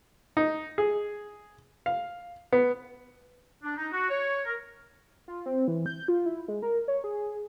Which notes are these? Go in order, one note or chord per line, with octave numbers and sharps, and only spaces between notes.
D#4
G#4
F5
B3
D4
D#4
F#4
C#5
A#4
F4
C4
E3
G6
F4
E4
G#3
A#4
C#5
G#4